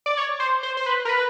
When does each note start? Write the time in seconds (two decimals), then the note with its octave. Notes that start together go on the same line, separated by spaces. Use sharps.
0.06 D5
0.17 C#5
0.40 C5
0.63 C5
0.77 C5
0.86 B4
1.05 A#4
1.09 B4